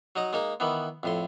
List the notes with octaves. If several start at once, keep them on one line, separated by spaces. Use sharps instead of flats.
F#3 D#4 D#5
G#3 A#3 D#4
D#3 E3 B3
F2 A2 C6